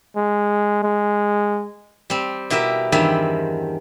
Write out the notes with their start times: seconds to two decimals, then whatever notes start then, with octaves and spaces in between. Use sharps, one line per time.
0.16 G#3
0.83 G#3
2.10 G3 C4
2.50 B2 E4 G4 A#4 E5
2.92 E2 G2 D#3 G3 C4 E5